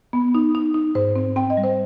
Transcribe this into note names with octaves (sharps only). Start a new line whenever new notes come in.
B3
D#4
D#4
D#4
G#2 C5
C4
C4 G5
D#5
G3
C5